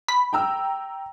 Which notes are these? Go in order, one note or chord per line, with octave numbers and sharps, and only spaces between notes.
B5
G5 A#5 E6